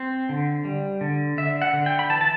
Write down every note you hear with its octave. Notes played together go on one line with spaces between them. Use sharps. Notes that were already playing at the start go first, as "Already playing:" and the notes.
Already playing: C4 C5
D3
G3
D3
D3 E5
F#5
D3
G5
B5
E3 A5
A5